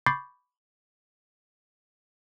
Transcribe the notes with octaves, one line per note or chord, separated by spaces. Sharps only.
B5 C#6 D6 G6 A6 C7